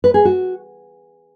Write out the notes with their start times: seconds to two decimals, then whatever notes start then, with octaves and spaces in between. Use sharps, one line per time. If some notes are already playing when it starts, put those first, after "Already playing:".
0.04 B4
0.14 G#4
0.25 F#4